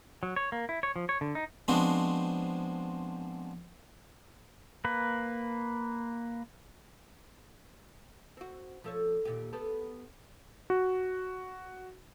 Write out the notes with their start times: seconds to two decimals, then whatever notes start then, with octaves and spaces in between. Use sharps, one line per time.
0.23 F#3
0.36 C#5
0.52 A#3
0.69 E4
0.83 C#5
0.96 F3
1.09 C#5
1.21 D3
1.35 D#4
1.68 F3 G#3 B3 C4 D4 F#4
4.85 A#3 B4
8.37 C4 F#4
8.84 F3 A4 C#5
9.25 D#2 A#2 G4
9.53 B3 G4 A4
10.70 F#4